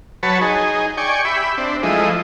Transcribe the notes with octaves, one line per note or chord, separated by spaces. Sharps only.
F#3 B4 C#5 A5
D#4 G#4
D5 G5 G#5 C#6
G4 E5 B5
C4 D4
F3 G#3 A3 E4 D#5